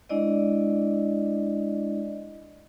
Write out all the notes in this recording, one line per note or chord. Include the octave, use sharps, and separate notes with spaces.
G#3 D4 E4 D5 D#5